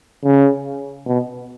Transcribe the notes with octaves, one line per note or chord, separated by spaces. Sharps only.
C#3
B2